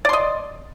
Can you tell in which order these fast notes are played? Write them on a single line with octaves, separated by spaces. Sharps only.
D5 C6 D#5